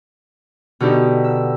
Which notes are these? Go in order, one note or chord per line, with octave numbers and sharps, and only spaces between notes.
B2 D3 D#4 G4
E6